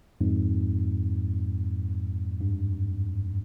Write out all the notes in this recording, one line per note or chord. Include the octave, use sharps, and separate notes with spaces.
F2 G#2
G2